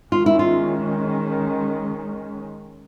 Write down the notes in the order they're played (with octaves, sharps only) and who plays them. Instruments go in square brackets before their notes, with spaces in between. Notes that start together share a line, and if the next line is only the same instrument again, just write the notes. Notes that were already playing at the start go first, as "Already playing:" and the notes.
[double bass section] D#3 G#3 C#4 [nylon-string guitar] F4
[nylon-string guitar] E4
F4